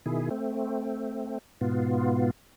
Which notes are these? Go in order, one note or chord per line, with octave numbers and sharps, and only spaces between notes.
B2 D#3 E4 G#4
A3 C4
G#2 B2 B3 F4